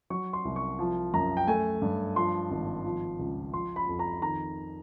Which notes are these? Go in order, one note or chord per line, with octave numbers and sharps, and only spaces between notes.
F#3 C#6
C6
C2
C#6
F3
F#2 A#5
G5
A3 G#5
G2
F3 C6
G#1
F3
C#2
F3 C6
B5
F2
A#5
D#3 A#5